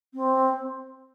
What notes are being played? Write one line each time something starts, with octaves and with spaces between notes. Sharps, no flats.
C4